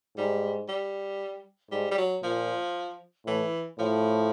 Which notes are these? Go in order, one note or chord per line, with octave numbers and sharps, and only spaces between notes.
G#2 G3
G3
G#2 G3
G3
F#3
A#2 F3
A2 E3
A2 F3